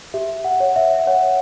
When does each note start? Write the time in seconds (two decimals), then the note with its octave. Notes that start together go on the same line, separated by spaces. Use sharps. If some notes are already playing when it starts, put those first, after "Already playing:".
0.14 G4 E5
0.45 F#5
0.60 C#5
0.76 E5
1.07 C#5 F#5